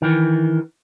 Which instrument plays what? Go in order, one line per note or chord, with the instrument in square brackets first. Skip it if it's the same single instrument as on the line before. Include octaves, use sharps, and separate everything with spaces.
[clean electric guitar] D#3 E3